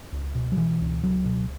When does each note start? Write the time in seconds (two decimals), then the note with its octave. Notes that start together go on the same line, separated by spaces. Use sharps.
0.12 C#2
0.35 B2
0.52 F#3
0.57 B2 E3
0.81 C#2
1.03 C#2 F#3
1.25 B2